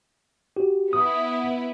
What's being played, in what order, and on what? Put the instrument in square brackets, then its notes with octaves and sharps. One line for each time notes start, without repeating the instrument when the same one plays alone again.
[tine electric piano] F#4 G4
[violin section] B3 E4 [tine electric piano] D#6